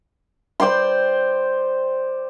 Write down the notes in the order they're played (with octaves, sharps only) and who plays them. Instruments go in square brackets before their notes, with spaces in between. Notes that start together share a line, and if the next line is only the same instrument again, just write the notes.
[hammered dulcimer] C5 D5 G5 C6